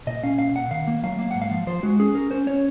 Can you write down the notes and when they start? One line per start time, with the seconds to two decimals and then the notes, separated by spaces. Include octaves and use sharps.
0.07 A#2 D#5
0.23 C#4 F5
0.39 A#2 F5
0.55 A#2 F#5
0.71 D#3 F5
0.87 A#3
1.03 F#3 F5
1.19 A#3 F5
1.31 G#2 F#5
1.42 F5
1.51 F3
1.67 F3 C5
1.83 G#3 F#4
1.99 C#4 G#4
2.15 C#4 A#4
2.31 C#4 C5
2.47 C#4 C#5